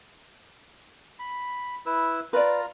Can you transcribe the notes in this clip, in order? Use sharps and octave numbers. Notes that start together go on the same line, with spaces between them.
B5
E4 B4 E6
F4 B4 D5 A#5